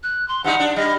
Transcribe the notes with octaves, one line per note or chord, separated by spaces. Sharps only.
F#6
C6
G2 G3 D#4 F#5
D4
G3 D#5